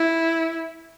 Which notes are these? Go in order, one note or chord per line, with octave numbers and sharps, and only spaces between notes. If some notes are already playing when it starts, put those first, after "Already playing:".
Already playing: E4